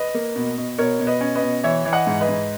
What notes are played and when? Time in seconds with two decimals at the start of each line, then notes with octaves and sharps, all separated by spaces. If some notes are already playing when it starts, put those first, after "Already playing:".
Already playing: B4 D#5
0.15 A#3
0.36 B2
0.58 B2
0.78 B2 A#4 C#5
1.00 B2
1.07 B4 D#5
1.21 C#4
1.35 B4 D#5
1.42 B2
1.64 E3 C#5 E5
1.85 E3
1.93 D#5 F#5
2.07 G#2
2.21 B4 D#5
2.29 G#2